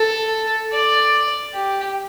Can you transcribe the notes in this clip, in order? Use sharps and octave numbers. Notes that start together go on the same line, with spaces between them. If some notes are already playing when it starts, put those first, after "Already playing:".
Already playing: A4
D5
G4